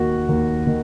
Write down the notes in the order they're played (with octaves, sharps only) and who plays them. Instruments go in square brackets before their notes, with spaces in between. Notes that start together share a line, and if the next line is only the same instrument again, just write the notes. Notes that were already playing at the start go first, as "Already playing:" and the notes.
Already playing: [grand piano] D#2 D#3 F#4
D#2
D#3